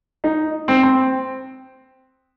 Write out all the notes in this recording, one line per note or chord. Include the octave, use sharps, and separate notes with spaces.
D#4
C4
C4